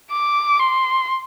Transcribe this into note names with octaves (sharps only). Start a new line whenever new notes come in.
D6
C6